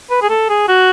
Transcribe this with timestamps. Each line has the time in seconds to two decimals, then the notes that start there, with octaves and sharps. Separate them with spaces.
0.11 B4
0.22 G#4
0.30 A4
0.49 G#4
0.68 F#4